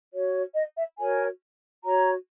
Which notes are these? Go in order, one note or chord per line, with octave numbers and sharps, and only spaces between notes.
F#4 C#5
D#5
E5
F#4 A#4 C#5 G#5
F#4 C#5 A#5